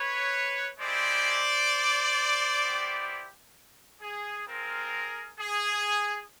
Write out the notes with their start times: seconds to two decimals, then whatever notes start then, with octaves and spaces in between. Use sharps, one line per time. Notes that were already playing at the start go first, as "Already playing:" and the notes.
Already playing: B4 C#5
0.79 G#3 C4 E4 G4 C5 D5
2.63 B3 E4 G4
4.00 G#4
4.46 C4 F4 G#4 A#4
5.38 G#4